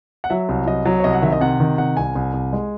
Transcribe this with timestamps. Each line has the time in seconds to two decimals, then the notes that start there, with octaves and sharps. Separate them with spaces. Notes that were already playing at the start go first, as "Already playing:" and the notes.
0.24 F#5
0.30 F#3 E5
0.49 C2
0.66 F#3 D#5
0.85 F#3
1.00 C#5
1.04 C2 D#5
1.13 F#5
1.22 D#3 E5
1.32 D#5
1.41 C3 F#5
1.60 D#3
1.78 C3 F#5
1.97 C2 G#5
2.15 C2
2.34 C2
2.53 G#3